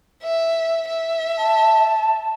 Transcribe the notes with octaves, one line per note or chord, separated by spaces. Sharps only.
E5
E5
A5